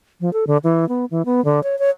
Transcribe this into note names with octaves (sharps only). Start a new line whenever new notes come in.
F3
A4
D3
E3
B3
E3
B3
D3
C#5
C#5